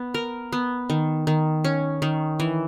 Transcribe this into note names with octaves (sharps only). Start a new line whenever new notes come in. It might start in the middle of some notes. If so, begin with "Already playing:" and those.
Already playing: B3
A#4
B3
D#3
D#3
C#4
D#3
E3